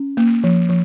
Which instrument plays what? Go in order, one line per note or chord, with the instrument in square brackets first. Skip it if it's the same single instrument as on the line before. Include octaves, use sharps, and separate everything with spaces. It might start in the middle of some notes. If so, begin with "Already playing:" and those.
Already playing: [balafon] C#4
A#3
F3
F3